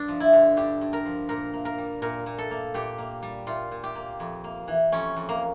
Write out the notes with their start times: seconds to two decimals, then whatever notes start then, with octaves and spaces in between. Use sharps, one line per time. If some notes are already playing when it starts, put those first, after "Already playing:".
Already playing: G2 D4
0.08 F3
0.20 E4
0.33 D3
0.57 G2 G4
0.81 G2
0.93 A#4
1.05 F3
1.29 A#2 A#4
1.53 A#3
1.65 A#4
1.78 G3
2.02 A#2 A#4
2.26 A#2
2.38 A4
2.51 A#3
2.74 A#2 G4
2.98 A#3
3.23 G3
3.47 A#2 F4
3.71 A#2
3.84 G4
3.95 A#3
4.20 F2
4.44 A#3
4.68 E3
4.92 F2 C#4
5.16 F2
5.29 A#3